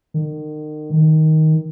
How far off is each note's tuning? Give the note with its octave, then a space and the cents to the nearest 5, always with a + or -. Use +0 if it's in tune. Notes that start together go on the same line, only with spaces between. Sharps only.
D#3 -35
D#3 +10